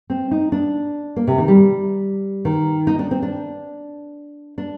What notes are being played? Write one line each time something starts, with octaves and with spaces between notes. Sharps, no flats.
C4
D#4
D4
A#3
C3
D#3
G3
D#3
D#4
D4
C4
D4
D4